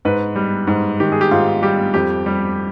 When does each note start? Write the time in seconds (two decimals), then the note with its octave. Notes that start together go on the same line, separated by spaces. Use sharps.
0.05 G#2 B4
0.36 G3
0.67 G#2
0.99 D#3 G4
1.12 G#4
1.21 G4
1.31 G#2 F4
1.62 G3 G4
1.94 F2 G4
2.26 G3